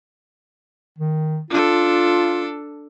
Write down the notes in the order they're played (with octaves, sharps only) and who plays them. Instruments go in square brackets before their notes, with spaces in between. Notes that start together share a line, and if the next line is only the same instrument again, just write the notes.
[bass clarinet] D#3
[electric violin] D4 A4 [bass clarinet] F4